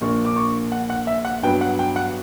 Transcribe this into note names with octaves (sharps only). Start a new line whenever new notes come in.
A#1 A#2 A#3 D4 C#6
D6
C#6
F#5
F#5
E5
F#5
G2 F#3 B3 G5
F#5
G5
F#5